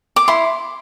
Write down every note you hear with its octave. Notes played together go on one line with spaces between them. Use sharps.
D6
E4 C6